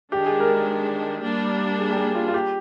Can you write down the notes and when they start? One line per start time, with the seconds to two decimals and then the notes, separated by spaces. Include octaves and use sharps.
0.12 D#3 G#3 D4 G4
0.26 G#4
0.40 A#4
0.54 A#4
1.23 G3 A#3 D4
1.78 G#4
1.90 G4
1.97 G#4
2.15 F4
2.28 F4
2.34 G4